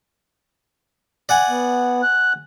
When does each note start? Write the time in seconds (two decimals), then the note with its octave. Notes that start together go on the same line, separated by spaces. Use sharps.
1.29 D5 F#5 G#5
1.49 B3
2.03 F#6